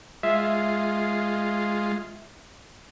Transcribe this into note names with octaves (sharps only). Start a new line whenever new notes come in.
G#3 F4 E5